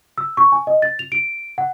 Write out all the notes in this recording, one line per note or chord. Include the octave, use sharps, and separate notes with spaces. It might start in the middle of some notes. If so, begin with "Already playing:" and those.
E6
C#6
G#5
D#5
A6
F7
D7
F#5